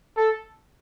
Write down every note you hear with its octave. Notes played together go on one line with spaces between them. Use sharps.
A4